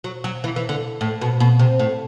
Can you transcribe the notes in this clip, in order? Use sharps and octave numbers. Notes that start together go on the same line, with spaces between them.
F#3
F#3
E3
E3
D3
A2
B2
B2
C3
A2